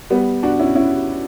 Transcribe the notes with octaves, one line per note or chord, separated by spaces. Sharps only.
G3 B3
D4 F#4
C#4 E4
C#4 E4